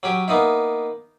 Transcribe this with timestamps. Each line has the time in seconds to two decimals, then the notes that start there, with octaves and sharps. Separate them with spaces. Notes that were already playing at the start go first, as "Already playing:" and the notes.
0.03 F#3 C#4 G4
0.28 A#3 B3 D#4 E4